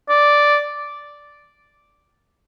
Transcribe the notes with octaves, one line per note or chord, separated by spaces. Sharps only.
D5